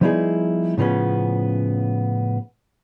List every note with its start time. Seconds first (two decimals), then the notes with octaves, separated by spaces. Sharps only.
0.01 F3 G3 B3 D#4 E4 G#4
0.78 A2 C#3 F3 B3 C#4